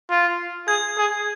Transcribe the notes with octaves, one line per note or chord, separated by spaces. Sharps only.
F4
G#4 G#6
G#4